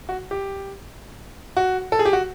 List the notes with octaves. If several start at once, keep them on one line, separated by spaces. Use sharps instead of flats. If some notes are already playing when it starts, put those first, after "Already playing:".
F#4
G4
F#4
A4
G#4
G4
F#4